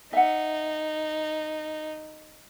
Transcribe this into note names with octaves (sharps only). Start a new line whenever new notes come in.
D#4 E5 F#5